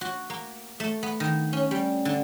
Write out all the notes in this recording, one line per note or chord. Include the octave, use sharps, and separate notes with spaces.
F#4
A#3
A3
B3
D#3
C#4
G3
D3